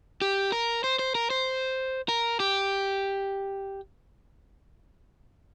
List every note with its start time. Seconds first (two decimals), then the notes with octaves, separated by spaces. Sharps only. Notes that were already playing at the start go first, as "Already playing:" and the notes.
0.22 G4
0.52 A#4
0.84 C5
0.99 C5
1.15 A#4
1.30 C5
2.09 A#4
2.40 G4